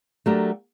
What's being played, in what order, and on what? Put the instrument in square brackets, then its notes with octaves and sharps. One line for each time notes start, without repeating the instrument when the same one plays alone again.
[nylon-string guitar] F#3 A3 D4 G4 A#4